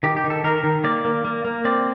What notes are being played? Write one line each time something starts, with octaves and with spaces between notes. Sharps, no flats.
D#3 G4
G4
D#3
A4
D#3 A#4
D#3
A#3 D5
A#3
A#3
A#3
C4 D5